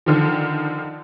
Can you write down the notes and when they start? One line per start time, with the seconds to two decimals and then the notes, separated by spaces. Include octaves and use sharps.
0.06 D3 D#3 F3